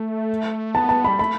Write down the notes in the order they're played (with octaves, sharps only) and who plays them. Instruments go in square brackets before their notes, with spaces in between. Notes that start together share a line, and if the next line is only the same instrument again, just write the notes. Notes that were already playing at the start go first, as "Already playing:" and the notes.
Already playing: [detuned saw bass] A3
[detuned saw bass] B3 [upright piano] A5
[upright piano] A5
[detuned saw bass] G3 [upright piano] B5
[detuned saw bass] A3 [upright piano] B5